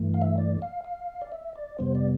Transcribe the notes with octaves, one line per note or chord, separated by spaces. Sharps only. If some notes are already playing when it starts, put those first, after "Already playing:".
Already playing: G2 E3 A3
F5
E5
D5
F5
F5
D5
E5
D5
F2 C3 G3 B3 C5
D5